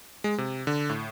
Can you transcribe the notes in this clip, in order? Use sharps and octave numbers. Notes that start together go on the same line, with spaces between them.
G#3
C3
D3
A2